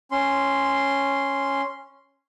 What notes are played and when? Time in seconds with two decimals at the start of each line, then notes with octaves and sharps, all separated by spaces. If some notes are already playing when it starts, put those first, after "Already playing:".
0.11 C#4 C6